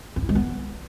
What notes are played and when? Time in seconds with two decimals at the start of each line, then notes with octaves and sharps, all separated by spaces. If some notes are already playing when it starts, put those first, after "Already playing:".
0.16 C#4
0.23 E4
0.29 G#3
0.35 B3